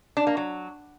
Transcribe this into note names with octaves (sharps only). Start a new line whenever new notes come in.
D4
A#3
F#3